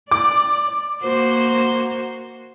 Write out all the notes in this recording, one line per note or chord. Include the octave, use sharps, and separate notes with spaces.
D5 D6
A#3 F#4 C5